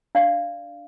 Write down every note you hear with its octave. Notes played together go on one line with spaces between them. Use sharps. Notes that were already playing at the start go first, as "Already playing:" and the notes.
D4 D5 F5